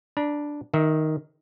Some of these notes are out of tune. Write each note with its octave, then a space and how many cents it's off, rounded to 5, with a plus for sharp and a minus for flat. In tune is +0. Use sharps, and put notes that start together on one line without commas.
D4 +0 A#5 +45
D#3 +0 E5 -20